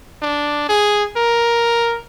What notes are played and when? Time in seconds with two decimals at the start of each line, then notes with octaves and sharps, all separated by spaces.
0.22 D4
0.69 G#4
1.16 A#4